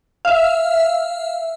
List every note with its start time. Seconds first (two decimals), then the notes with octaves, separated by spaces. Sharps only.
0.25 E5 F5